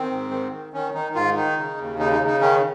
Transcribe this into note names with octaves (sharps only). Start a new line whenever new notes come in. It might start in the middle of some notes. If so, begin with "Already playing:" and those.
Already playing: D#3 C4
G#2
D#3
D#3
D#3 C#4
D#3 D#4
G#2 F4
D#3 D#4
C#3
D#2
C#3 D#4
D#4
C#3
D#4
D#3 C#4